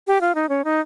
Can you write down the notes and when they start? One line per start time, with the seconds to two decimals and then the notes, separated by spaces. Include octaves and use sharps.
0.07 G4
0.21 F4
0.35 D#4
0.49 C#4
0.64 D#4